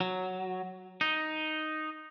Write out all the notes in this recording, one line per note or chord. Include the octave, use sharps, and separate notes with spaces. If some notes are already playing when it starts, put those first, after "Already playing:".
F#3
D#4